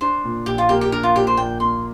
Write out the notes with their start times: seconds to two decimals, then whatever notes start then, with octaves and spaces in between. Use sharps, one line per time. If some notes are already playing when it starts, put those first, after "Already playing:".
0.01 D4 C5
0.25 A#2
0.46 A#1 G4
0.58 F4
0.69 A#3 G4
0.81 G4
0.92 D4 A#4
1.03 F4
1.16 A#2 G4
1.27 C5
1.37 A#1 G5
1.60 A#3 C6